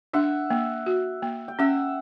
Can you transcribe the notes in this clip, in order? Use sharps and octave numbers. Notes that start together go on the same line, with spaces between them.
D4 E5 F#5
A#3
F#4
A#3
G5
C#4 E5 F#5